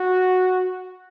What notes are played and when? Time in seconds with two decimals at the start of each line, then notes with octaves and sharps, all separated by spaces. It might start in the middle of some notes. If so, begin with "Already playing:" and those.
Already playing: F#4